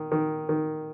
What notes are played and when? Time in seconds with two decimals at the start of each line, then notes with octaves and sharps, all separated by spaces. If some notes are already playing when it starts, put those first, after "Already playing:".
Already playing: D#3
0.12 D#3
0.49 D#3